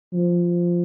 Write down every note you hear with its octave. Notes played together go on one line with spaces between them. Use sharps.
F3